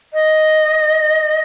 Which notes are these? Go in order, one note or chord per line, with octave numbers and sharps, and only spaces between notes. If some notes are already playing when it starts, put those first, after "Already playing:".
D#5